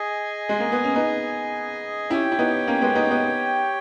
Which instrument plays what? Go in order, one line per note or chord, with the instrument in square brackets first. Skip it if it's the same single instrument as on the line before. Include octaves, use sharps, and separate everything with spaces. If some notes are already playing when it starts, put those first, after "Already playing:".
Already playing: [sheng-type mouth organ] G#4 D#5 G#5
[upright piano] G#3
A#3
B3
C#4
B3 D#4
[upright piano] C#4 E4 [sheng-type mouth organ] G4 C#5 G5
[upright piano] E4
B3 D#4
A#3 C#4
G#3 B3
B3 D#4
B3 D#4